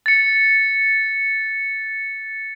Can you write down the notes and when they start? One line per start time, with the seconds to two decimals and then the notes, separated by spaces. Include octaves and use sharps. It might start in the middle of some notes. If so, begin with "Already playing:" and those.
0.06 A6 C#7